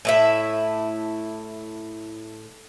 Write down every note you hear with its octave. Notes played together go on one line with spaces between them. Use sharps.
A2 E4 E5